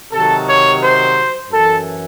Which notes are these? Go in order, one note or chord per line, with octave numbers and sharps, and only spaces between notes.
C3 D#3 F#3 A4
C#5
C5
F#2 E3 A4